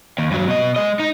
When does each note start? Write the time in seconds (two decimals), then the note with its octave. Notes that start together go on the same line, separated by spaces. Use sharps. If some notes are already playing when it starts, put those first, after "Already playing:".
0.18 D#2
0.31 G2 F#3
0.48 B2 D#5
0.76 G#3 D#5
0.99 D#4